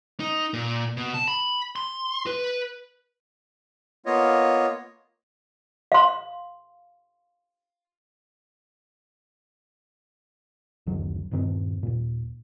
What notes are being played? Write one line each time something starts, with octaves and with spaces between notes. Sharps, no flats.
D#4
A#2
B2
A5
B5
C6
B4
A#3 B3 F4 C#5 D#5
F5 C6
F#1 D2 D#3 F#3
D#1 G2 D#3 C4
D#2 A#2